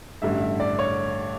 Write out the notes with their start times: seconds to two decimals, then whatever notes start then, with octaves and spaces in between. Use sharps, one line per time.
0.22 A1 G2 D3 E5
0.41 E5
0.60 D5
0.79 C#5